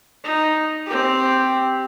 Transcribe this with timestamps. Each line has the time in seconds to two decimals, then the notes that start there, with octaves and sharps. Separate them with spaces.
0.24 D#4
0.86 C4 G4